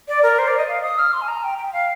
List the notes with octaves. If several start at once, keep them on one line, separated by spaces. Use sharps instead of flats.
D5
A#4
C5
D5
D#5
F5
D#6
F6
C6
G#5
A#5
G5
G5
F5